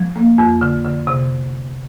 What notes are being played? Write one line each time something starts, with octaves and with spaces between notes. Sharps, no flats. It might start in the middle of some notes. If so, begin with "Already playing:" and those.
Already playing: F3
A#3
F2
D3
D3
C3